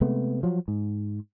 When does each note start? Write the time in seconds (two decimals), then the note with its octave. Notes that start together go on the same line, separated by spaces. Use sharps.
0.01 C3 G#3 A3 B3
0.43 F3 F#3
0.68 G#2